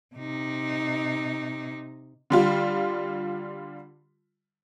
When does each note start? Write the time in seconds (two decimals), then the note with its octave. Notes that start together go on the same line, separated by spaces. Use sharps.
0.16 C3 D#4
2.30 D3 G3 F4